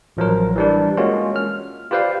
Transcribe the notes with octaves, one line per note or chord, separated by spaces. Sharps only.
A1 F3 F#3 A#4
E3 G3 D4
G#3 A#3 C#4 F4 F#4
F6
F4 G4 B4 C5 D5 F5